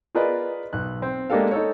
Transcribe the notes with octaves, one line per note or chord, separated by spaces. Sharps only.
F4 G#4 A#4 B4 D5 D#5
B1 F#6
C4
G#3 A#3 D4 G4 A4 F5
D#4 A4 C#5